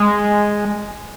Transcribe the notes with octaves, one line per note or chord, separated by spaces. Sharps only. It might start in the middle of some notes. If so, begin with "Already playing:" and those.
Already playing: G#3